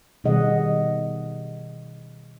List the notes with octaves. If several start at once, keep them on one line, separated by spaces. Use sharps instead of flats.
B2 D#3 G3 G#4 D#5 F#5